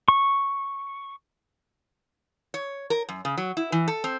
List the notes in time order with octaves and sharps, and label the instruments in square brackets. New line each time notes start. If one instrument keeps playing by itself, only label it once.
[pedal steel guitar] C#6
[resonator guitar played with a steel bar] C#5
A#4
F#2
C#3
F#3
E4
E3
A4
C4